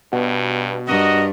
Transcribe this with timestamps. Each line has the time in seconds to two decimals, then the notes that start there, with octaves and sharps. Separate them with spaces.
0.12 G2 B2
0.87 G2 F#4 A#4 D#5